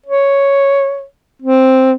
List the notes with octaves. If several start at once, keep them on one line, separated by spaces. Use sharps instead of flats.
C#5
C4